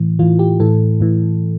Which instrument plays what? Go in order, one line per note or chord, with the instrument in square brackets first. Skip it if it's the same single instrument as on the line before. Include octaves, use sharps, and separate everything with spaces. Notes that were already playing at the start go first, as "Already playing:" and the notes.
Already playing: [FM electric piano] A2 E3
A2 E3 F4
G4
A2 E3 A4
A2 E3